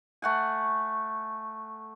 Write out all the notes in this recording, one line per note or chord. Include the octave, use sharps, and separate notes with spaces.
A3 F#5 G#5